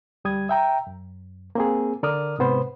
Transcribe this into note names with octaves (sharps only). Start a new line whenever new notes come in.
D2 G3 D#6 G#6
E5 G5 A#5
F#2
A#3 C4 G#4
D3 A#4 D5 D#6 F6
G#2 C3 B3 C5